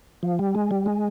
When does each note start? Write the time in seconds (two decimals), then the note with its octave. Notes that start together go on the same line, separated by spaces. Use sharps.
0.23 F3
0.39 G3
0.55 G#3
0.71 G3
0.86 G#3